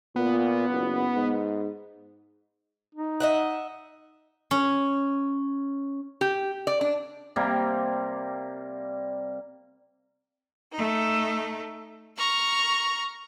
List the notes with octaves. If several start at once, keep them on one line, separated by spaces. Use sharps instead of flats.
A#2 B3
F#1
G#2
D#4
D#5 E5 F#5
C#4
G4
D5
D4
C3 G3 A#3
A3 D#4
A#5 C#6 F6